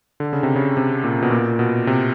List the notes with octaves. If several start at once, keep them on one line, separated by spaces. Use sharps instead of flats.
D3
C#3
C3
C#3
C3
A#2
B2
A#2
B2
C3